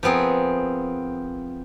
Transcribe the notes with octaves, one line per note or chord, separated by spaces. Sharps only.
F3 B3 C4 G#4 A#4